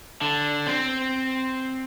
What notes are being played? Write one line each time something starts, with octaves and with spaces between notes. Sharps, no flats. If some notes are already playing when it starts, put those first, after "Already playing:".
D3
C4